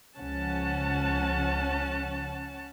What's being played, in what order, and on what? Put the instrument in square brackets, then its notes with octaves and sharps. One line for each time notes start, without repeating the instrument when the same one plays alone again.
[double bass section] C#2 C#3 F3 [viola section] C#4 F#5 A5